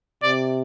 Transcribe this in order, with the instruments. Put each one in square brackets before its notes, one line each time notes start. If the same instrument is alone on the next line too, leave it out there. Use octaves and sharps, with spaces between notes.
[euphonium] C3 [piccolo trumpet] D5